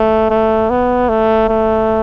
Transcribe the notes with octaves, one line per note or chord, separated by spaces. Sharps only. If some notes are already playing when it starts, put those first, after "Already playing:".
Already playing: A3
A3
B3
A3
A3